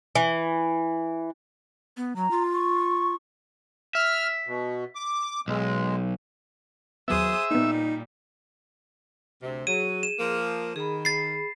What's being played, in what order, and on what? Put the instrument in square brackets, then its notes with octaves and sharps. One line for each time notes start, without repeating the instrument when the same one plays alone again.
[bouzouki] E3
[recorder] B3
[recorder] F#3 [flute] A#5
[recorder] F4
[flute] C#6
[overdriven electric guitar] E5 [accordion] F6
[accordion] B2
D6
[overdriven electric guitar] B1 [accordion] G#3
[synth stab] D#2 F#3 B3 [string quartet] G#4 C5 D#6 [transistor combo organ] E5
[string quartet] A#2 G3 [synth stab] A#3 B3 [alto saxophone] D#4
[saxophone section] D2 C3
[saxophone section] F#3 [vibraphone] G#4 [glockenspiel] D#7
[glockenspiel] E7
[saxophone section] F3 A#3
[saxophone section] D#3 [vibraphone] G#4 B5
[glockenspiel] A6 C7